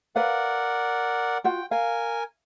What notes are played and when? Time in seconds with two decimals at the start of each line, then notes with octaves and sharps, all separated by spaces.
0.16 A#4 B4 D5 F5 F#5
1.44 F4 F#4 F#5 G5
1.71 A#4 F5 G#5